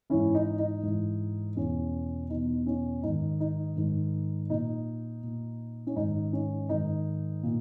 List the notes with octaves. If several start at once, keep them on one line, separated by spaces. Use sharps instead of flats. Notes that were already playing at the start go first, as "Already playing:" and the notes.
G#2 E3 C#4 E4
D#4
D#4
G#2 E3
E2 B2 C#4
E2 B2 D#4
C#4
G#2 D#3 D#4
D#4
G#2 D#3
A#2 D#4
A#2
C#4
G#2 D#3 D#4
C#4
G#2 D#3 D#4
A#2